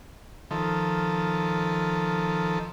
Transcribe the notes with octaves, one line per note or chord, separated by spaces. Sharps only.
D#3 F3 A4